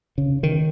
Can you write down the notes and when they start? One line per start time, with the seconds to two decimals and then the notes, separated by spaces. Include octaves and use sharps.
0.18 C#3
0.43 D#3